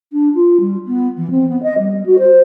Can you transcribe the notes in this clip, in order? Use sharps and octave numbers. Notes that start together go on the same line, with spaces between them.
D4
F4
G3
B3
E3
C4
B3
D#5
G3
F#4
C5